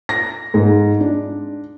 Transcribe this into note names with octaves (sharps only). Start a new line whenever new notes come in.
A#6
G#2
D4